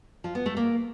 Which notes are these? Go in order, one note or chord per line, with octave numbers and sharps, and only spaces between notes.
F3
B3
A3
A#3